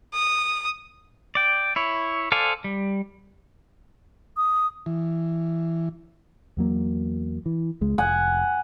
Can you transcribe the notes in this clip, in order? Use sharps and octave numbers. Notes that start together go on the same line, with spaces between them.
D#6
D5 G5
E4 C#5
A4 C5 D5 F5 G#5
G3
D#6
E3
E2 F#3 A#3
E3
C#2 G#3
F1 F#5 G#5